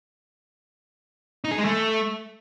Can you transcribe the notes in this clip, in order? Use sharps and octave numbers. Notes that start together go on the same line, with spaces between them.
D#4
G#4
G#3
A3